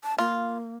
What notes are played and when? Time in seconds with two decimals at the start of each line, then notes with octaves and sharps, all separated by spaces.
0.04 A5
0.18 A#3 F4